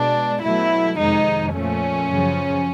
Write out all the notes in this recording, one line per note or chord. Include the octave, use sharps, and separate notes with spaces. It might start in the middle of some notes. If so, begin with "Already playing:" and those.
Already playing: B2 G#3 D4
B2 F#3 A3 E4
F2 C3 D#3 G#3 D#4
A#2 F3 A3 C#4
F#2 C#3 F3